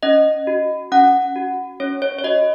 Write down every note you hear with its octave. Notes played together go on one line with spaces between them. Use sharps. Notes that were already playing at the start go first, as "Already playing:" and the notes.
C#4 D#5
F#4
C#4 F#5
F#4
C#4 C#5
C#5
C#5
F#4 D#5